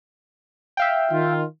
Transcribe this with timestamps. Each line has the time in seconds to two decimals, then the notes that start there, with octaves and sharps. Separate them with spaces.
0.77 E5 F5 G5
1.11 D#3 F4